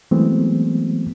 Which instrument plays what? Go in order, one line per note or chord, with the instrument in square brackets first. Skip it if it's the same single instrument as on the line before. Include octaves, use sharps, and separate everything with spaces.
[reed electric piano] E3 F#3 G#3 A3 B3 C4